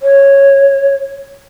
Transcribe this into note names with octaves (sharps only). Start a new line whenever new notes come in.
C#5